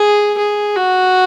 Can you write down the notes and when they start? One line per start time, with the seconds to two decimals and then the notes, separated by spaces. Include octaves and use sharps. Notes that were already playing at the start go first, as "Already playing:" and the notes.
Already playing: G#4
0.38 G#4
0.76 F#4